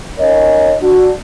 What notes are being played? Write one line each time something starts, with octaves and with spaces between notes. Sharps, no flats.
C#4 D#4 A#4 C#5 D#5
D4 F#4